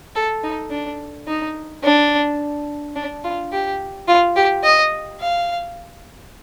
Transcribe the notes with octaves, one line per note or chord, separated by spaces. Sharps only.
A4
D#4
D4
D#4
D4
D4
F4
G4
F4
G4
D#5
F5